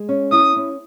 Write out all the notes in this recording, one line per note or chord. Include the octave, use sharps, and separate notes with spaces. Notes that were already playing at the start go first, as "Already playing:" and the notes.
Already playing: G#3
C#4
E4 D#6
C#4